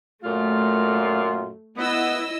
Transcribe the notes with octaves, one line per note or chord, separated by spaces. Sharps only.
F#2 A#2 A3 F4
B3 E4 D#5 E6